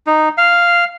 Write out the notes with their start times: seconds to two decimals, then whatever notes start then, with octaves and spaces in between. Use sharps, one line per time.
0.07 D#4
0.38 F5